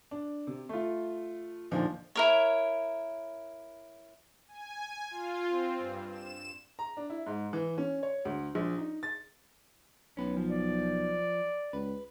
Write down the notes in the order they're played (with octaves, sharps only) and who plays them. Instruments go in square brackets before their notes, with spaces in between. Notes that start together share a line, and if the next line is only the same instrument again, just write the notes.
[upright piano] D4
C3
A3 F4
D#2 A#2 D3 F3 D#4
[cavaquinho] E4 A#4 C#5
[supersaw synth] G#5
F4
C4
G2
E7
[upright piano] A#5
D4
E4
G#2
E3
C#4
C#5
D2
A#1
D#4
A6
[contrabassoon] B1 [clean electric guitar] C#4 B4
[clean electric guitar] F3
[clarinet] D5
[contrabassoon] C#2 [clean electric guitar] B4